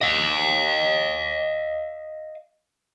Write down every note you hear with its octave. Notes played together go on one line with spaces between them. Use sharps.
D#5 F5